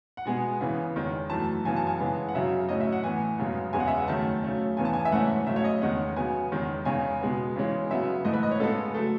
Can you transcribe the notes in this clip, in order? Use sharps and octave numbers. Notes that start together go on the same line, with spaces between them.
F#5
B2 G#3 B3 G#5
C#3 E3 B3
E2 D#3 G#3 C#4
F#2 E3 A3 A5
F#2 C#3 E3 B3 G#5
A5
G#5
C#3 E3 G#3 B3
F#5
F#2 C#3 F#3 E5
A2 F#3 C#4 D#5
E5
F#5
A2 E3 B3 G#5
F#2 C#3 G#3 B3
E2 C#3 G#3 B3 G#5
F#5
E5
F#5
F#2 D#3 A3 C#4 A5
C#3 F#3 A3 C#4
E2 C#3 E3 B3 G#5
A5
G#5
E5
G#2 E3 A3 C#4 F#5
C#3 F#3 A3 E5
C#5
D#5
E2 D#3 G#3 C#4 F#5
C#3 F#3 B3 G#5
E2 D#3 G#3 C#4
E2 C#3 G#3 C#4 G#5
B2 G#3 B3
C#3 E3 G#3 C#4
C#3 F#3 B3 E5
G#2 E3 A3 D#5
B4
D#5
C#5
C#3 G#3 B3 A4
F#3 A3 A4